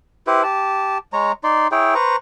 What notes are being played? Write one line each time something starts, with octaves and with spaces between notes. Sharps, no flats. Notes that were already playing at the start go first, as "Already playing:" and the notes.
E4 G4 B4 C5
G4 A5
G#3 C#5 A#5
D#4 D5 C6
E4 G#4 C#5 G5
B4 C5 A#5 C#6